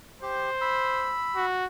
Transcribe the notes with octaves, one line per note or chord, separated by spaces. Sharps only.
G4 C5
B5 E6
F#4